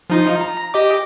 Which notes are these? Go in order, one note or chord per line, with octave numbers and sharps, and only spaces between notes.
F3 D#4 F4
A#5
G4 D#5 D6